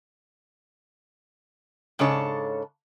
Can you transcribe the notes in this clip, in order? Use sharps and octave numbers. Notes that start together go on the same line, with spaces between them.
G#2 C#3 D4 A4 C#5 A5